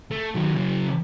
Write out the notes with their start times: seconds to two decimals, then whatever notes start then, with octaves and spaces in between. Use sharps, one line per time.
0.11 A3
0.35 D#3 F#3
0.56 C#3 F#3